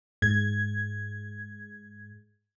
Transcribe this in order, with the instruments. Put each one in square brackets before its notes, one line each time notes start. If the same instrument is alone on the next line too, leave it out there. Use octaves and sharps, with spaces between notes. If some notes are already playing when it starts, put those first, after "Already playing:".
[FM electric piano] G#2 G#6